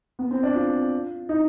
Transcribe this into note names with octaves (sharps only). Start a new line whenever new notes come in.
B3
C4
D4
F4
D#4